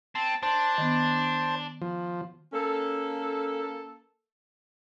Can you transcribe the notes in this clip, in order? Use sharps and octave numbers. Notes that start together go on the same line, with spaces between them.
C4 A5
D4 C5 A5
D#3 B3
F3
A#3 C#4 A4